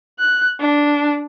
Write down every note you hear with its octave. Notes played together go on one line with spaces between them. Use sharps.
F#6
D4